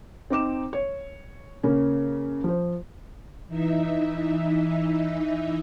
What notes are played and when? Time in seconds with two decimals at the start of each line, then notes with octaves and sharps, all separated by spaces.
0.30 C4 D#4 D6 E7
0.73 C#5
1.63 C#3 A#3 C#4
2.44 F3 C5
3.48 E3 D#4 E5